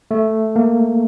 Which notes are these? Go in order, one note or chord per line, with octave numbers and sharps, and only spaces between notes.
A3
A#3